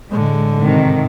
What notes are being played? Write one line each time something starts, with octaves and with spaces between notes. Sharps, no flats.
A2 D3 G#3
G#2 C3 D#3